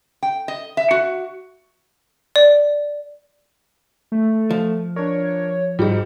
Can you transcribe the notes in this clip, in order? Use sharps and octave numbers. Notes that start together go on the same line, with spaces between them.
G5
D#5
E5
F#4
D5
A3
F3
D4 A#4 C#5
G#2 G3 D#4 F4 F#4 G#4